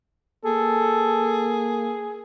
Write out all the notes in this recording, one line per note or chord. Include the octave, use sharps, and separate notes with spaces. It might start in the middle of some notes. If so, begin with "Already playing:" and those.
A#3 G#4 A4